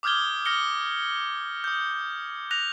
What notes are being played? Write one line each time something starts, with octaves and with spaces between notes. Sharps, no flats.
D6 D#6 F6 G6 G#6 G7
D#6 F6 A#6 C#7 G7
D#6 G6
F#6 A#6 F7